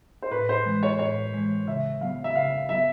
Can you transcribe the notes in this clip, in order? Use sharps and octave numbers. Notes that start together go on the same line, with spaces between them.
C5
A2 B4
C5
E3 G#3
C#5
A2 C#5
E3 G#3
C#3 E5
F#3 B3 F5
E5
C#3 F5
F#3 B3 E5